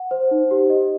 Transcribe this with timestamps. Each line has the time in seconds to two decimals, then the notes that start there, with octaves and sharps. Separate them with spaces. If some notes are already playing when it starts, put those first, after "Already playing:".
Already playing: F#5
0.11 C5
0.31 D#4
0.51 G4
0.70 D#5